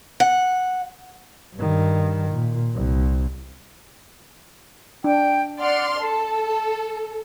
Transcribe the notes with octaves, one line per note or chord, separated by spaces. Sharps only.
F#5
G2 D#3
A#2
C2
D4 G5
D5 F#5 C6 F6
A4 A5